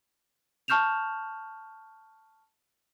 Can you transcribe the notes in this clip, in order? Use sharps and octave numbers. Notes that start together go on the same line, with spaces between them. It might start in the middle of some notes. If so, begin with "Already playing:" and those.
A5 C#6 F6 G6 E7 F7